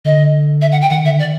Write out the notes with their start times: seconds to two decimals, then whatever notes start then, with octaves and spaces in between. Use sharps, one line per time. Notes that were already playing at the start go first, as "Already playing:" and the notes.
0.05 D3 D#5
0.61 E5
0.72 F#5
0.81 G5
0.90 D#3 F#5
1.05 D3 E5
1.18 D#3 D5